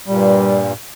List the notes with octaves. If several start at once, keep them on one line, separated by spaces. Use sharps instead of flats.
G2 A#2 G3